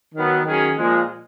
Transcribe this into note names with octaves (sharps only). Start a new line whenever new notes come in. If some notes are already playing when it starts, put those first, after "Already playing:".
D#3 F#3 B3
D#3 F#3 C#4 G#4
A#2 F3 G#3